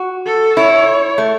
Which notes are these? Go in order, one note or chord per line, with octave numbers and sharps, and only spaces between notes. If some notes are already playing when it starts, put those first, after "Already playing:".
Already playing: F#4
A4
E4 C#5
A3